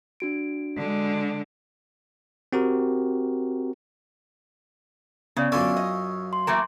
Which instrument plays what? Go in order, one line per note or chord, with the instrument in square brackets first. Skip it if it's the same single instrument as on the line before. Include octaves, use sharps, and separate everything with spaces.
[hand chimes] D4 F#4 D7
[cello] D3 G#3
[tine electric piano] C4 F#4 G4 A#4
[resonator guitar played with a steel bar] C#3 [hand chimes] B3 C#4 D5
[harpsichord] F#2 F4 G#5 [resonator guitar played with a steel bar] D3 [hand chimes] C#6 E6
[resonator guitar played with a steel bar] D#5
[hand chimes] C6
[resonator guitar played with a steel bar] E3 A3 A#3